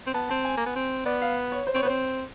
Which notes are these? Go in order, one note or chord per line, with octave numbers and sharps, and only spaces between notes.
C4
B3 A5
C4 A5
G#5
A#3
B3
C4
B3 D5
F5
C#5
C5
C4 C#5
B3
C4 C5